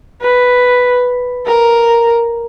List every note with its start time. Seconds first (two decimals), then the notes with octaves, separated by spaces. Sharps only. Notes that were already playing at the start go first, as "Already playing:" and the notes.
0.21 B4
1.46 A#4